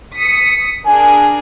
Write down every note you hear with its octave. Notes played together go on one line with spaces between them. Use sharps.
D#6 B6 C#7
D4 G#4 A#4 G#5